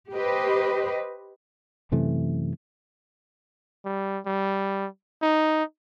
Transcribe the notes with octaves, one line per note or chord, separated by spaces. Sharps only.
G4 B4 C5 D#5
F#2 C3 E3 A3
G3
G3
D#4